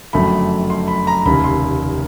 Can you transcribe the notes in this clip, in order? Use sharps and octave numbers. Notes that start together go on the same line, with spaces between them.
F#1 F2 D3 F#3 A3 B5
C6
B5
A#5
F1 D#2 C#3 B5
C6